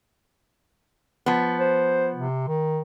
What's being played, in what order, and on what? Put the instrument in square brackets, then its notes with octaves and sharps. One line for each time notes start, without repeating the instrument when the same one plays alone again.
[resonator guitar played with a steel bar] F3 B3
[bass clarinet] C5
C3
D#3